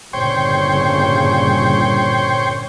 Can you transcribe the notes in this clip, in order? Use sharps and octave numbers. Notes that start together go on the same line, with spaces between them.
G1 A#2 C#3 C5 C#5 G5